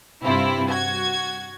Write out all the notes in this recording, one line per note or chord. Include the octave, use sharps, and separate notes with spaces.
G2 C3 C4 E4 F4
F#4 G#6